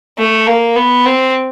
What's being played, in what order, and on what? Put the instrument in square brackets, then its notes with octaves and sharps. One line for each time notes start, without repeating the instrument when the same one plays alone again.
[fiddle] A3
A#3
B3
C4